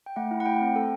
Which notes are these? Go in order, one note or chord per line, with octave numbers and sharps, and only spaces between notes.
G5
A3 F#5
E4
F#5
A3 G5
C4
A4